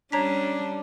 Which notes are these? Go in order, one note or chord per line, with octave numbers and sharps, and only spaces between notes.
G3 C#4 D4 C#5 A#5 B6